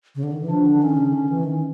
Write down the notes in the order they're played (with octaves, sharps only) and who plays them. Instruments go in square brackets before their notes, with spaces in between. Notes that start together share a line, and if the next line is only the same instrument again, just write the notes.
[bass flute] C#3
D3
D#3
E3
[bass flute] F3 [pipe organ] D4
[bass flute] D3
[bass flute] D#3 [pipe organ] C#4
[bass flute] C#3
D3
E3
D#3